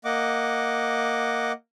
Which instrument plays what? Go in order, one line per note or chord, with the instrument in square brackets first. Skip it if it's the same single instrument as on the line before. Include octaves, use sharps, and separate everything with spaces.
[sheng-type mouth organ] A#3 D#5 F#5 D6